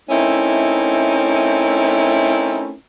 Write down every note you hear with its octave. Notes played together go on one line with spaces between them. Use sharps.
A3 C4 C#4 D#4 E4 A#4